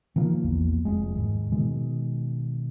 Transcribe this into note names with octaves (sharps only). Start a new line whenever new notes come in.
D#3 F3 A#3
A#1 E2 A#3
F1 G#3
D#2 G#2
B2 D#3 G#3